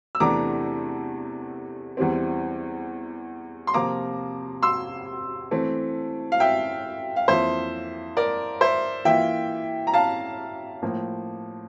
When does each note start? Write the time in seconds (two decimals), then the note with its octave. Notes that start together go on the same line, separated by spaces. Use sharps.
0.15 E6
0.20 E2 C3 E3 A3 D4 A#5 D6
1.97 E2 E3 G3 C4
3.67 C6
3.74 C3 F3 A#3 F4 A#5 D6
4.63 C6 E6
5.51 E3 A3 C4
6.32 F5
6.40 E5 G5
7.16 F5
7.28 F2 E3 A#3 F4 C5 E5
8.17 A#4 D5
8.61 C5 E5
9.05 E3 A#3 F4 E5 G5
9.87 A#5
9.94 F5 A5
10.82 A2 F3 A#3